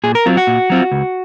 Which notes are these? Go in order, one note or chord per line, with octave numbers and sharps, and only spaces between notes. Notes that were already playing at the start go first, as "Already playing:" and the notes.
A#2 G#4
A#4
F#3 C4 F4
F#4
A#2
F#3 C4 F4
C#2